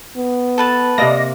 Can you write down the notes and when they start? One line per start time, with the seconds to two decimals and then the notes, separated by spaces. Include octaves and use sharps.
0.17 B3
0.58 A4 B4 A5
0.98 C3 A#3 D5 D#5 A#6